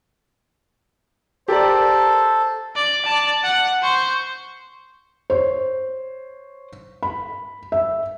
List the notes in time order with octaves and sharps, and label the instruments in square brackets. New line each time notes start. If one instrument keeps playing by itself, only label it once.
[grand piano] G4 A#4 D5 [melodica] A4 [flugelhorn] C5
[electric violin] D5
D5 A5
F#5
C5 C#6
[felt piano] C5 C#5
B5
E5